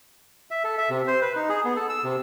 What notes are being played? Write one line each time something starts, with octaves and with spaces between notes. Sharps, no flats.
E5
A4
E5
C3
C5
B4
D#4
G#4
B3
A4
E6
C3